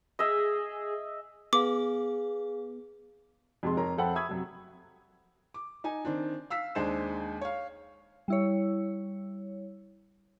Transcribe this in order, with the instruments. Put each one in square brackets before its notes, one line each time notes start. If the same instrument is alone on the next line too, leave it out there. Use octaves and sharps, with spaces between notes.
[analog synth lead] G#4 [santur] D#5 E5
[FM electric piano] B3 [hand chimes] G#4 F5 [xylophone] D6
[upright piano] F2 C3 G#3 A5 C6
F2 A#4 C#5 A#5 C6
F2 A4 C5 F#5 G5 B5
E5 B5 C#6 D#6 E6 G#6
F#2 C3
[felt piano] D6
D#4 G#5
D#3 C4 D4
F5 E6 B6
D#2 G#3 D4 C5 E7
C#5 F5
[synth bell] G3 E4 C#5